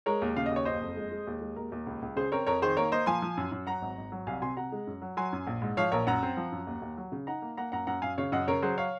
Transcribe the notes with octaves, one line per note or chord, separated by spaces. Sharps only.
G#3 A#4 C#5
D#2
C#3 F5
D#5
D#2 C#5
F#1 C5 D#5
F2
G#3
G#3
D#2
G#3
D#2 A#4
D#2
C#2
C#2
C#3 G#4 C5
C4 A#4 C#5
F2 A#4 C#5
D#3 G#4 C5
A#3 A#4 C#5
A#3 C5 D#5
F3 G#5 C6
F3
F#2
F#2
F#3 F#5 A#5
G#1
G#1
F#3
C2 F5 G#5
C3 G#5 C6
C3 F#5 A#5
G#3
F#2
F#3
F#3 G#5 C6
F#2
A#1
G#2
F3 C#5 F5
A#1 A#4 C#5
F#2 F#5 A#5
C4
F3
F#2
D#2
D#2
F#3
C#3
D#4 F#5 A#5
A#3
A#3 F#5 A#5
F#2 F#5 A#5
F#2 F#5 A#5
F#2 F5 G#5
C#3 C#5 F5
F#2 D#5 F#5
C#3 A#4 C#5
F#3 G#4 C5
C#5 F5